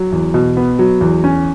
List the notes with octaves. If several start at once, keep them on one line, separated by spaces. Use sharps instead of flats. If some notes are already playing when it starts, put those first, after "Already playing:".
Already playing: F#3
E2
B2
B3
F#3
E2
C#4